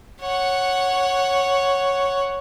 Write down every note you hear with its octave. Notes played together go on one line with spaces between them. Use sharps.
C#5 F#5